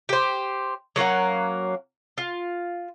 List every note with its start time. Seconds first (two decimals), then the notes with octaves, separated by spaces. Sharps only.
0.09 G4 C5
0.96 F#3 A#3 C#4 F#5
2.18 F4